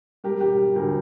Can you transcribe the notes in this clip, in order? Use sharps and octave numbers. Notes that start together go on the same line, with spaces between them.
G3 G4 A#4
E1 G4
G3
D2 G4 A#4